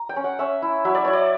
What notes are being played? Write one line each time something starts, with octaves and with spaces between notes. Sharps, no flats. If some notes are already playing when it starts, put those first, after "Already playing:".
Already playing: A#5
G5
C#4
F#5
C#4 E5
E4
F#3 E5
D5
E4 C#5
D5